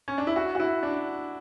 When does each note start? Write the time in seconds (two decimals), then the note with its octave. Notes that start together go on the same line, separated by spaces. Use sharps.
0.08 C#4
0.18 D4
0.27 E4
0.36 F#4
0.55 F#4
0.60 E4
0.83 D4